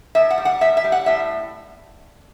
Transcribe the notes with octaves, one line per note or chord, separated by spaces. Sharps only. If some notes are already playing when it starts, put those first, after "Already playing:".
A2 E5
F#5
G3
F#5
A2 E5
E5
G3
F#5
A2 E5